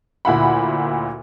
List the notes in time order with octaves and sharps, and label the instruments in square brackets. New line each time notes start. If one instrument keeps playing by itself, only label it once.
[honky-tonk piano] D2 A#2 E4 F#5 B5